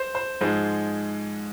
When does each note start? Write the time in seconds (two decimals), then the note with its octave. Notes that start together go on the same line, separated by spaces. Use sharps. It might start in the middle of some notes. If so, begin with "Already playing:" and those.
Already playing: C5
0.15 C5
0.41 G#2 F3 G#3 C5